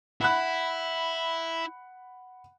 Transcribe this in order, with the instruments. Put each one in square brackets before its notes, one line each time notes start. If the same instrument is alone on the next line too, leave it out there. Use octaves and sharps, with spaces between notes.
[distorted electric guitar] E4 [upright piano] F#5 B5 F#6